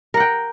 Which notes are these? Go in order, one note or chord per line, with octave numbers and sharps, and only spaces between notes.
A#4 F#5 G5